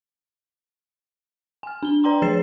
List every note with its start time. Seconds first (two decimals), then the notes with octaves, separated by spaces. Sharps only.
1.63 G#5 F6
1.83 D4 G7
2.04 B4 D5 G5 A#5 C6
2.22 F3 G#4 C#5 A6 C7 E7